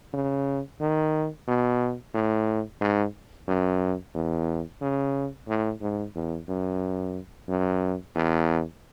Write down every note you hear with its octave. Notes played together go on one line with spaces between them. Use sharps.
C#3
D#3
B2
A2
G#2
F#2
E2
C#3
A2
G#2
E2
F#2
F#2
E2